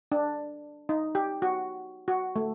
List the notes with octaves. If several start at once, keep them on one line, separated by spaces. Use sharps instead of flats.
D4
D#4
G4
F#4
F#4
A3